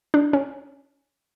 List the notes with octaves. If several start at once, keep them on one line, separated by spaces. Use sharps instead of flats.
D4
C#4